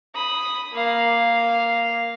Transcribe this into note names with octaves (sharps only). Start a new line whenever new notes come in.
B5 D#6
A#3 F5